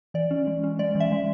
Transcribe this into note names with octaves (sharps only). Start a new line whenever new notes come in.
E3 D5
C#4
G#3
C#4
G#3 D5
E3
E5
G#3